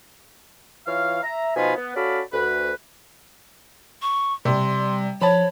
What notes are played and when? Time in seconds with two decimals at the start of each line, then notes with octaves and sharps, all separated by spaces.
0.87 E3 F4 C#5 F5
1.23 E5 A#5
1.56 B2 F3 D#4 F4 G#5 B5
1.76 B3
1.96 C#4 F#4 A4 D5 F5 B5
2.33 D2 B4
4.02 C#6
4.45 C3 G3 C6
5.21 F3 C#5 A5 B5